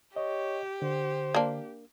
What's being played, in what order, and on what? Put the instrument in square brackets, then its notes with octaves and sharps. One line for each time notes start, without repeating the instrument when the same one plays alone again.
[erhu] G4 [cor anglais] C#5 [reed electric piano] D#5
[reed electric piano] D3 [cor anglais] C5
[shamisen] A#3 D4